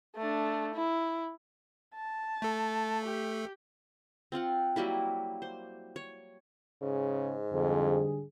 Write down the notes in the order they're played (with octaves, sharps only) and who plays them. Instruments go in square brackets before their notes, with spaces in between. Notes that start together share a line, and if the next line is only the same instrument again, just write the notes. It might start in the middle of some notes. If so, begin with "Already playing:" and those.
[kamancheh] A3 D4
E4
A5
[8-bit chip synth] A3 A4
[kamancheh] G4
[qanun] C4 F4 F5 F#5
F#3 G3 A#3 E4
C5
C#5
[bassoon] G#2 [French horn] C#3
[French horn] F2 [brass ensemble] D3 G3 G#4